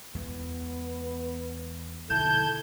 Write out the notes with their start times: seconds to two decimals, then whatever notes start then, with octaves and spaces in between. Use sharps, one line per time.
0.15 E2 G#3 B3
2.10 A#1 B2 D3 D#3 E4 A5 G6 G#6